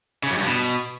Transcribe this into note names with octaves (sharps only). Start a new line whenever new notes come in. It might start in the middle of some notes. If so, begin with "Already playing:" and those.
C#3
F#2
G2
B2